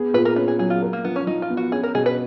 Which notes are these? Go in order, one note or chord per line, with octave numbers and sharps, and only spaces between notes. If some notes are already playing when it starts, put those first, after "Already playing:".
Already playing: B3 G#4
A#2 B4
A#4
C#4 B4
G#4
F#3 G#4
F4
A#4
A#3
F3 B3
C#4
F3 D#4
F4
B3
F#4
C#4 G#4
A#4
B2 G#4
B4